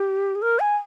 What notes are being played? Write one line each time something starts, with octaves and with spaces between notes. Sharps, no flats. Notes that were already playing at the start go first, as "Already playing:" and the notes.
Already playing: G4
G#4
A#4
G#5